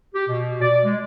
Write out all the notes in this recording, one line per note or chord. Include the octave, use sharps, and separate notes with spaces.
G4
B2
D5
G#3